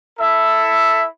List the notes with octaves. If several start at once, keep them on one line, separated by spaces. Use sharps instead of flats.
E4 A4 E5